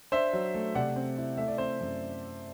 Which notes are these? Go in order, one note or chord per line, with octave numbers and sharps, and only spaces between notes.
D4 C5 E5
F#3
A3
C3 D5 F#5
C4
E4
A3 E5
D5
C4 C5 E5
F#2